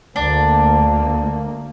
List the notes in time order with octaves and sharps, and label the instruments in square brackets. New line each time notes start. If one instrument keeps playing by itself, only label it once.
[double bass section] D2 A#3 [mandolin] D4